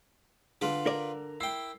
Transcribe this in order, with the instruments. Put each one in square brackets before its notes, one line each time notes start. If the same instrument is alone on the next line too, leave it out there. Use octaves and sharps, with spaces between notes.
[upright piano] D3 [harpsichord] F4 B4 D6
[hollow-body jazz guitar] A#4 D5
[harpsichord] E4 G5 [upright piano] C7